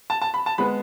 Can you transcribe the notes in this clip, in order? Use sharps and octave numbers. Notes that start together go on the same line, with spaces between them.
A5
A5
B5
A5
G#3 B3 B5